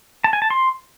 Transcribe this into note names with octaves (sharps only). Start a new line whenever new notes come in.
A5
G#5
A5
C6